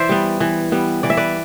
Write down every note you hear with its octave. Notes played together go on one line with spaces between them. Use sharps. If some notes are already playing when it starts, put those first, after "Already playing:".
Already playing: E3 C5 D5 E5
G3 B3
E3
G3 B3
E3 D5
E5
B4 D5